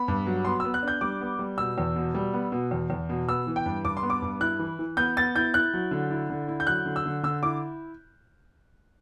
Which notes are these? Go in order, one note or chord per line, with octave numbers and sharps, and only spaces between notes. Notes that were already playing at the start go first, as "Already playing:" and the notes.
Already playing: B3 B5
G2
F#3
B3 C6
B3 E6
F#6
D4 G6
G3 D6
B3
G3
B2 E6
E2
B2
G3
B3
B2
E2
E2
B2
B3 E6
E3
G5
G2
G2 D6
C6
B3
D6
G2
E4 F#6
E3
E3
B3 G6
B3 A6
E4 G6
E4 F#6
F#3
D3
E4
D3
E4
G6
F#3 F#6
D3
E6
D3
D3 E6
E4 D6